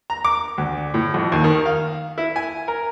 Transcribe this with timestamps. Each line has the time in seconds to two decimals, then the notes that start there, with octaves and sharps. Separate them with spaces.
0.10 A#5
0.25 D6
0.58 D2
0.94 A2
1.14 F2
1.32 D#2
1.44 D#3
1.66 F5
2.18 E4
2.36 G#5
2.68 A#4